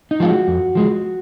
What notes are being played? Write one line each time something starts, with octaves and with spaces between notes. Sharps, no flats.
D#4
F3 G#3 F4
F#4
F2
F3 G#3